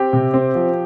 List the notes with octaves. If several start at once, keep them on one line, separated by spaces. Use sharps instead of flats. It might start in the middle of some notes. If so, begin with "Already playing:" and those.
Already playing: C4 G4
C3
C4
F3